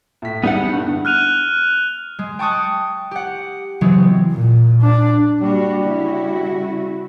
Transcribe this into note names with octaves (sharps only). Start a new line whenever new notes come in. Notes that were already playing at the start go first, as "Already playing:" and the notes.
A2 B6
G3 G#3 B3 D#4 E4 F#5
G2 D3
F6 F#6 D#7 F7
G#3
G5 A5 C#6 D#6 F#6
G4 F#5
C#3 E3 F#3 G#3 B3 C4
A#2
D4
G3 A#3 D4 F#4
C#3 E4 F#4